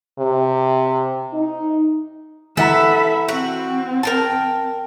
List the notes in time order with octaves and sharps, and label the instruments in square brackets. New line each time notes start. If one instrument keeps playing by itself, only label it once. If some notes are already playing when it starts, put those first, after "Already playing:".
[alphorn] C3
[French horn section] D#4
[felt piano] E3 F#5 A#5 [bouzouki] A4 [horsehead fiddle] E5 B5
[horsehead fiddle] C4 [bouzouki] F#4
[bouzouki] A#4 G5 A5